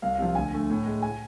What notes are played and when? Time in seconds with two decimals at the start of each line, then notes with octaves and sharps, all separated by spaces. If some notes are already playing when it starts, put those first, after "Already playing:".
0.02 C2 F5
0.18 C3 F3
0.35 D2 G#5
0.52 D3 A3
0.69 A2
0.86 G#3
1.02 G#5